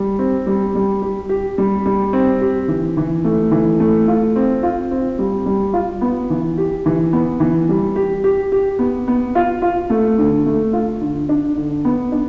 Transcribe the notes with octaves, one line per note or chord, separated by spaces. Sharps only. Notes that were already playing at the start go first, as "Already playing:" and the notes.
Already playing: G3
C4
G3
G3
G4
G4
G3
G3
C4
G4
E3
E3
A3
E3
A3
F4
C4
F4
C4
G3
G3
F4
B3
E3
G4
E3
B3
E3
G3
G4
G4
G4
B3
B3
F4
F4
A3
D3
A3
F4
D3
D4
D3
B3
D4